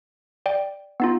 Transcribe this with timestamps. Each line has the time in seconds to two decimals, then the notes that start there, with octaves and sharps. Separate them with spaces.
0.46 D5 G5
1.00 B3 D#4 F4